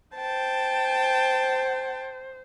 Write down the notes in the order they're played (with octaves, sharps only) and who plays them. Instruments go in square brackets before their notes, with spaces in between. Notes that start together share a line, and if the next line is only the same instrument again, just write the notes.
[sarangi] C5 [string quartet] G5 A5